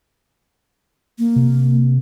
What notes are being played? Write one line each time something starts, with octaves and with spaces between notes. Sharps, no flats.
A#3
C3